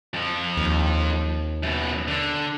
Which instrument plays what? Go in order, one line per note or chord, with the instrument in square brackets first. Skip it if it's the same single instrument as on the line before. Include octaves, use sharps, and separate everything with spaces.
[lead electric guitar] F2 F3
[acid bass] D#2
[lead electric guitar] F#2 B2
D3